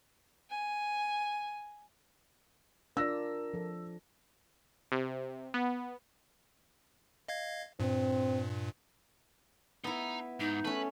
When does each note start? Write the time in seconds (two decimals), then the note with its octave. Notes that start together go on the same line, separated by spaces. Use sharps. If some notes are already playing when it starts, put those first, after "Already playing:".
0.50 G#5
2.97 D4 F4 A#4 D5 E6 A#6
3.54 F3 A4
4.92 C3
5.54 B3
7.28 D#5 F5 G#6
7.80 G2 A#2 C4
9.84 B3 D#4 E4 A#5
10.40 G#2 D#4
10.65 A3 C#4 B4